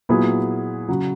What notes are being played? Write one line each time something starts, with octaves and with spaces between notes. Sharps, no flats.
A#2 F#3 B3 E4 G#4
C#3 F#3